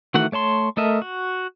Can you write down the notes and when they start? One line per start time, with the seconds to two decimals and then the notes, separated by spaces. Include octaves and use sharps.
0.14 D#3 E3 A3 F#4 F#5
0.32 A3 C#5 A5 C6
0.77 A3 A4 A#4 D#5 E5
1.02 F#4